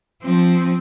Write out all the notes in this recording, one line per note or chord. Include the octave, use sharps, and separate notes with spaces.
F3 C4